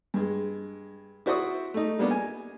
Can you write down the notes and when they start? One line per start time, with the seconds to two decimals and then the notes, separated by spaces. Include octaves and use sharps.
0.14 G2 G#3
1.26 E4 F#4 C5 D5 C#6 D#6
1.74 A3 D#4
1.99 G3 A#3 B3 D4
2.11 G#5